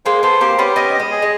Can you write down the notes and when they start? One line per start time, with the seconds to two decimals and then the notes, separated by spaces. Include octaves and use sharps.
0.06 G#3 A#3 C5
0.23 A3 B3 C5
0.41 A#3 C4 G4
0.58 B3 C#4 G4
0.76 B3 C#4 D#5
0.94 D#5
1.00 G#3
1.11 G#4
1.22 G#3